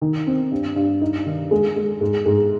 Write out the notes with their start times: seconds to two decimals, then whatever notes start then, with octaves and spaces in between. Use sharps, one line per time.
0.02 D#3
0.27 C4
0.51 G2
0.76 G2
1.01 D#4
1.26 D#3
1.51 G#3
1.76 G#3
2.01 G#2
2.26 G#2